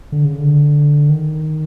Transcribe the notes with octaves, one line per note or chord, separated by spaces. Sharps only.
D3
C#3
D3
D#3